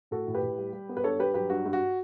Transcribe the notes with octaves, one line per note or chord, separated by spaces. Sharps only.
A2 F#4 A4
A2
G4 B4
A2
G3
G3
B3
B4
G2 A4 C#5
G2 G4 B4
F#3 G4 B4
G2 F#4
G2
F#4